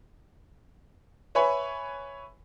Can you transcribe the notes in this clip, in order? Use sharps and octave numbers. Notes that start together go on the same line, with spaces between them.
B4 C#5 E5 G#5 B5 C#6